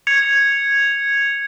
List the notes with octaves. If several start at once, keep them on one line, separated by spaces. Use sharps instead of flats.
G#6 C#7 F7